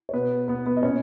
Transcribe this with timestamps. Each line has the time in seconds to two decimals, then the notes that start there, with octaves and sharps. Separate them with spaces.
0.09 C#5
0.13 B2 B3 B4
0.48 B3 B4
0.66 B3 B4
0.77 D#5
0.83 A#2 C#4 C#5